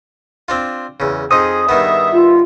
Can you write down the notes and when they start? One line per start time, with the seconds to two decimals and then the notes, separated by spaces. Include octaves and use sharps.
0.48 C4 D4 F4
1.00 E2 C#3
1.31 F2 F3 D#4 G#4 D#6
1.69 G2 D#3 B3 E5
2.12 F4